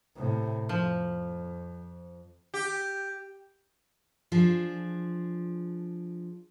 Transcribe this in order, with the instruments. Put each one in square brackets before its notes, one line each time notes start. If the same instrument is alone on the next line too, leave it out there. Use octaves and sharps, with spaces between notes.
[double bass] A2 C3
[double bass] F2 [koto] F3
[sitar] G4
[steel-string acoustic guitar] F3 D4 G#4